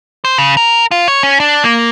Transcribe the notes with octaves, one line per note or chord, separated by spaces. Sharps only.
C5
C#3
A#4
F4
C#5
C#4
D4
A#3